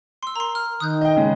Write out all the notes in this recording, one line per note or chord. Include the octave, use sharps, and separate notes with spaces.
C6 E6
A#4 A#5 C6
F6
D#3 D#6 F#6 G6
D#5 G5
C#3 G#3